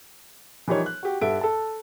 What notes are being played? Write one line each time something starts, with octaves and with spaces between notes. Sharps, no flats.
E3 F3 G3 D#4 A#4 C#5
F#6
F#4 G4
G2 A4 E5 F#5 D7
A4 A5